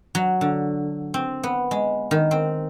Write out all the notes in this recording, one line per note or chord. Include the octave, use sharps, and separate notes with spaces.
F#3
D3
C4
B3
G#3
D#3
C4